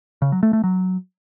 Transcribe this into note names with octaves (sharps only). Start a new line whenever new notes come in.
C#3
F#3
A3
A3
F#3